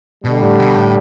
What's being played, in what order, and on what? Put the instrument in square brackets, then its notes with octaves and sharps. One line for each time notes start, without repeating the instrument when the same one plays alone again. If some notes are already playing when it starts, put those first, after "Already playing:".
[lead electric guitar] B2 [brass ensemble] D3 G3
[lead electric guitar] A2
B2
A2